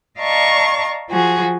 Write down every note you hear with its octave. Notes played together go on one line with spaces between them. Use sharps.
D5 D#5 F5 A5 A#5 C#6
F3 F#4 G#4